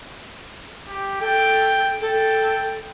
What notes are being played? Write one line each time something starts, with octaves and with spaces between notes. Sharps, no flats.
G4
A4 G5
A4 G5